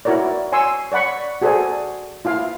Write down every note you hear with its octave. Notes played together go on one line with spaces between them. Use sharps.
E4 F#4 A#4 C#5 D5
C#5 G#5 C6 C#6 E6
C#5 D5 F#5 B5 C#6
F#4 G#4 A4 C5 D5 G#5
E4 F4 F5